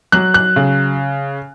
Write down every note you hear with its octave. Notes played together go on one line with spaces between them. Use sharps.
F#3 F#6
F#6
C#3